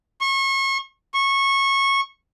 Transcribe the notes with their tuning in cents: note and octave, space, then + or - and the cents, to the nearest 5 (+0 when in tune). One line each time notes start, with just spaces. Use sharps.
C#6 -35
C#6 -20